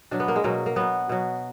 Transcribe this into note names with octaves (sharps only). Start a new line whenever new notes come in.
B2 F#3 D4
B3
A#3
G#3
B2 F#3 A#3
A#3
B2 F#3 B3
B2 F#3